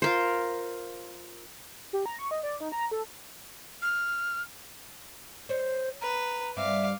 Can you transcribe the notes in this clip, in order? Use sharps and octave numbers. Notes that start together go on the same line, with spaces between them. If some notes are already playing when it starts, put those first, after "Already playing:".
F4 A#4 C5
G4
A#5
C#6
D#5
D5
D#4
A#5
A4
F6
C5 C#5
B4 A#5
G2 C4 E5 F5 D6